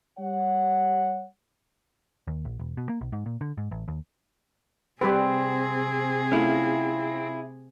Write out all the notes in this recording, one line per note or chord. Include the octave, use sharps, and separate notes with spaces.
G3 C#5 F#5
D#2
A#1
E1
B2
A#3
B1
G#2
A#2
D3
G#2
A1
D#2
C3 G3 C4 G4 G#4 B4
A3 C#4 E4 F4